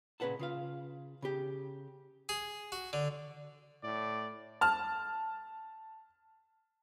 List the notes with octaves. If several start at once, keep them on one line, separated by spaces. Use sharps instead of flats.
A#2 C#3 B4 F#5 A5
C#3 F4 F5
C#3 G4
G#4
F#4
D3
A2 D5
A5 F6